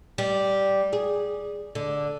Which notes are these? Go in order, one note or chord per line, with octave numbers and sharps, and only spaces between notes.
G3
G#4
D3